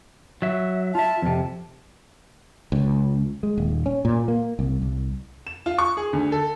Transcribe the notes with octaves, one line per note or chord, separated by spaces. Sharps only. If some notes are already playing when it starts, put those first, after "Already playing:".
F#3 E5
F4 E5 A5
F2 C3
C#2
G#3
D#1
C#4
A#2
A#3
C2
C2
E7
F4
C#6
G#4
D2
A4